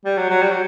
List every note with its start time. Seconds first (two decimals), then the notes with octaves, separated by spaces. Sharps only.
0.05 G3
0.17 F#3
0.30 F#3
0.42 G3
0.51 F#3